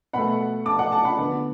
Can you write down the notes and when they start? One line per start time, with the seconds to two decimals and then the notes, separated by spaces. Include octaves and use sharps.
0.13 B2 A3 F#5 B5
0.66 A5 D6
0.79 F#5
0.92 A5
1.05 F#5 B5
1.18 D3 B3